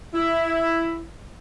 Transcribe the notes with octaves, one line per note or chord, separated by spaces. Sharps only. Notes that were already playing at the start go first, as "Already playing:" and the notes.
E4